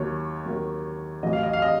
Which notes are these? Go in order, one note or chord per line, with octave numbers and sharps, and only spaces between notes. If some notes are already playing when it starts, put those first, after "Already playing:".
Already playing: D#2 D#3 F#3 C#5
D#2 D#3 F#3
A1 A2 F#3 D#5
F5
D#5
F5
D#5